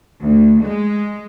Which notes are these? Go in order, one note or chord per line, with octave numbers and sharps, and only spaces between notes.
D2
G#3